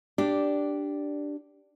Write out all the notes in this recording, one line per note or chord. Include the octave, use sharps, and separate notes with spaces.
D4 G4 D5